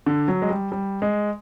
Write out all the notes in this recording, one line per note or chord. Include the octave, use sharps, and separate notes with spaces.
D3
F#3
G#3
G3
G3
G#3